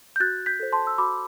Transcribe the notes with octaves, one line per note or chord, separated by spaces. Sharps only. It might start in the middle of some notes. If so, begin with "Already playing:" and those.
G6
F#4 F#6 A6
G6 B6
A4 C5
A5 C6
E6
F#4 B5 D6